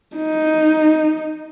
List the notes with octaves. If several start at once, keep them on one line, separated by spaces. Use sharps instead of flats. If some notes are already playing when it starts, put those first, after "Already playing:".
D#4